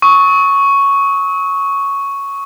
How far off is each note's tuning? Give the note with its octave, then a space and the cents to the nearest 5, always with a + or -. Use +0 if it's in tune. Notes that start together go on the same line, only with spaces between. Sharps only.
C#6 +0 E6 -45